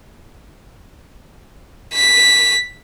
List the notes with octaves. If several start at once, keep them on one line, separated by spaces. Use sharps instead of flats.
B6